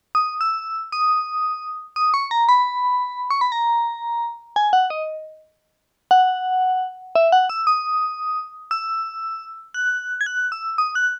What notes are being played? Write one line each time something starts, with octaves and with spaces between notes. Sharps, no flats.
D#6
E6
D#6
D#6
C#6
A#5
B5
C#6
B5
A#5
G#5
F#5
D#5
F#5
E5
F#5
E6
D#6
E6
F#6
G#6
F#6
E6
D#6
F#6